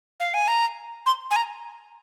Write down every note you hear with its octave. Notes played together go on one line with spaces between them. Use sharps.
F5
G#5
A#5
C6
G#5
A#5